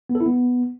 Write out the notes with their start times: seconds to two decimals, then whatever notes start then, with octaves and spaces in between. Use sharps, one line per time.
0.09 B3
0.15 A4
0.20 E4
0.26 B3